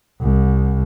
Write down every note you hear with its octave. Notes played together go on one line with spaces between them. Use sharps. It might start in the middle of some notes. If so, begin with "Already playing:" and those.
C2